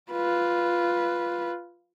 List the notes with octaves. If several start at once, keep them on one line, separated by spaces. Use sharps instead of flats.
F4 B4